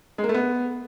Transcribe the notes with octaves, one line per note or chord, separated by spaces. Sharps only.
G#3
A#3
A3
B3